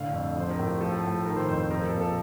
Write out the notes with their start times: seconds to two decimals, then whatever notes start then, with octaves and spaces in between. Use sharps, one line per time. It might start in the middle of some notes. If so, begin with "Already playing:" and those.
Already playing: A2 D3 F5
0.13 F2
0.36 F3 C5
0.51 A#4
0.59 A2
0.66 A4
0.81 F3 A4
1.03 A2
1.25 D#3 A#4
1.36 C5
1.48 F2 C5
1.60 C5
1.71 F3 A#4
1.86 A4
1.93 A#2
2.01 A4